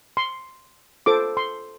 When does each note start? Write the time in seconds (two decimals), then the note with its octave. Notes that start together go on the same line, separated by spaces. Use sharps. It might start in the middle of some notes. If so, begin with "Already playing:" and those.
0.17 C6
1.06 F4 A4 C5 D6
1.37 C6